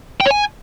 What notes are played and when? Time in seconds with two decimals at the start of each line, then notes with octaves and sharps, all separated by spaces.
0.21 G5
0.26 C#5
0.31 G#5